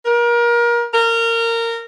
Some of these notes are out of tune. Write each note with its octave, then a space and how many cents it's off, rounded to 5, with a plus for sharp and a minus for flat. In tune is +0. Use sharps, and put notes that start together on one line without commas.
A#4 +30
A#4 -20